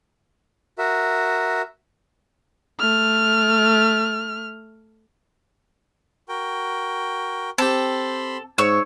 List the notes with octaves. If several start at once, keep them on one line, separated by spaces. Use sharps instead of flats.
F#4 A#4 E5
A3 F6
F#4 A#4 G5
C4 G4 A4 B5 C6
G#2 C#5 E6